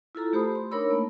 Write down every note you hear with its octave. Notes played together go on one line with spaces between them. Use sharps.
E4 F4 A4 A#5
A3 G4 C5 B5 D#6
C6
D4 D#4 A#4 C#5 B5 E6
A3 A#3